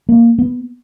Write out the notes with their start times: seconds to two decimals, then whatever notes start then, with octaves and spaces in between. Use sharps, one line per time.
0.09 A#3
0.39 B3